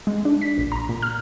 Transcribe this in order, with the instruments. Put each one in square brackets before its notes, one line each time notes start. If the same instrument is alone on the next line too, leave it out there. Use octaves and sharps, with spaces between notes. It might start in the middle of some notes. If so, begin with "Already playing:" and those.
[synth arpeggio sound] G#3
D4
B6
A#1
A#5
A#2
F6